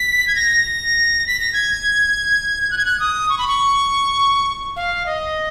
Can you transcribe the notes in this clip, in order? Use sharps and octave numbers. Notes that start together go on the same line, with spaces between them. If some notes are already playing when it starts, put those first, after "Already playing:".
Already playing: B6
G#6
A#6
B6
A#6
G#6
F#6
G#6
F#6
D#6
C#6
B5
C#6
F5
D#5